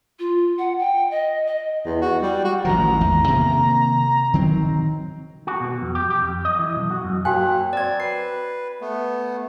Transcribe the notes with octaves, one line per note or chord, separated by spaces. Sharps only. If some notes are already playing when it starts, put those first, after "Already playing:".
F4
F#5
G5
D#5
D#5
E2
F#4
G3
F#4
A1 D#3 F3 A#5
G#1 E2
C3 D#3 A#3
D#3 F#3 C4
F#4
B2
F2
G4
G4
F2
D#5
E3
B1
F#4
F#2
F#3 A#3 F#4 G5 G#5 F#6
F#3 C4 D5 G#6
B4 C7
A3 B3